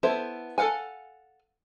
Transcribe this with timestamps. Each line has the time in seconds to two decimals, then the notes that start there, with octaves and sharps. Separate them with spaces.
0.03 B3 E4 A4 C5 E5
0.58 A4 A#4 F5 F#5 G#5